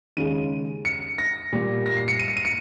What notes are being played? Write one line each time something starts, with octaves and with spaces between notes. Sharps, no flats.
D#2 C#3 G#3 D#7
C#7
A#6
A#2 G3 A#3
A#6
C7
C#7
D#7
C#7
D#7
C#7